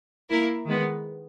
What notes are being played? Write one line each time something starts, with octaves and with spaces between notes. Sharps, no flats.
A#3 E4 A#4
D#3 G#3 B3